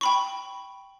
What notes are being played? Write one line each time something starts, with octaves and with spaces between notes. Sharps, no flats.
G5 B5 C#6